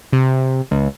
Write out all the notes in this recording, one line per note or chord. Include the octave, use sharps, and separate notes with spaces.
C3
C#2